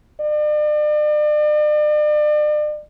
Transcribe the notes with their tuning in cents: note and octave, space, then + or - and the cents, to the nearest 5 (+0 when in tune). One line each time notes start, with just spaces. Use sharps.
D5 +40